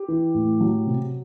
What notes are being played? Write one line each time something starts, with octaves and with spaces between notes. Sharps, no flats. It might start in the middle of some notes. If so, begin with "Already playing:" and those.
Already playing: G4
E3
A2
F#3
C3